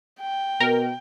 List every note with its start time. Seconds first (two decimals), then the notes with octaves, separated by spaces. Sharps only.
0.21 G5
0.60 B2 A#4